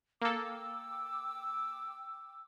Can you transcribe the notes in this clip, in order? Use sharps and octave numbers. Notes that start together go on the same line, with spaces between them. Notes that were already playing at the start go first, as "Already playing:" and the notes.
A#3 A4 G5 D6 E6